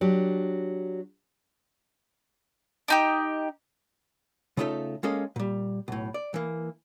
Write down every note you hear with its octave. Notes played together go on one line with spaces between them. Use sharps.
F#3 D4 G4
D4 D#4 G4
C#3 A3 D#4 F4 A4 E5
G#3 A#3 C#4 A4 D#5 F5
A#2 G3
B1 A2
D5
E3 A#3